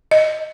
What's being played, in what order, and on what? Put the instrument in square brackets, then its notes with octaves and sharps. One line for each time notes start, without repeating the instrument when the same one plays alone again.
[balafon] D#5